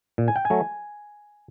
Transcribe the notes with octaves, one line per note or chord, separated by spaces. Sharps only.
A#2
G#5
G5
G#5
F#3 A3